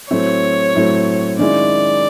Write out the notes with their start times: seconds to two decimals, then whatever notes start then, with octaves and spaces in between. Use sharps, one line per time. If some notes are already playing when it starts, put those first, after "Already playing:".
0.11 A2 F#3 A3 C4 C#5
0.75 A2 F#3 A3 C4
1.39 D#3 G#3 C#4 E4 D5